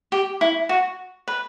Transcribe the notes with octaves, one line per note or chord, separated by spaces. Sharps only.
G4
E4
F#4
B4